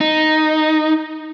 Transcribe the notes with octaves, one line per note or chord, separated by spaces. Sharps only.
D#4